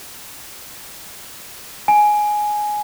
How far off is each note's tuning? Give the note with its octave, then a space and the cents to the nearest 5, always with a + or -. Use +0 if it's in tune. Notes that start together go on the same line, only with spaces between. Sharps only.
G#5 +10